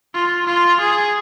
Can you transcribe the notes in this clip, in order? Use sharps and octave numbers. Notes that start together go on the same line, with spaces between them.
F4
F4
G#4